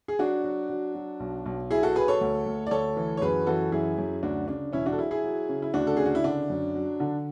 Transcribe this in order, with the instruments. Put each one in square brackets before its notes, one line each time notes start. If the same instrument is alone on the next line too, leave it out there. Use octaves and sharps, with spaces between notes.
[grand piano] G#4
F#3 D4 F#4
F#3
F#3
F#3
B1
B1
B2 E4 G#4
F#4 A4
F#3 G#4 B4
A4 C#5
D2
D2
D5
D2 A4 C#5
E3
C#5
F#2 G#4 B4
E3 F#4 A4
F#2 E4 G#4
F#2
D2 D4 F#4
C#3 D4
E1 C#4 E4
D4 F#4
A4
F#3 E4 G#4
E4 G#4
F#3
C#3
E4
D2 D4 F#4
A4
C#3 G#4
F#4
E4
D3 D4
F#2
F#3
D3